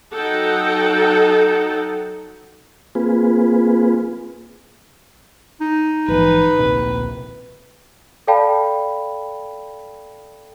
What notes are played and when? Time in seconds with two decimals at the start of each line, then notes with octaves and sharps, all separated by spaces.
0.14 F#3 D#4 A4 F#5 G5
2.95 A#3 C4 F4 G#4 B4
5.61 D#4
6.08 A#1 G#2 E3 B4
6.58 D1 A#1 C3
8.27 A4 D5 F5 G5 A5 B5